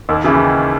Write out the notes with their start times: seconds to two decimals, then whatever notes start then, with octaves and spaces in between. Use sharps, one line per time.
0.09 D#2
0.24 C#3 E3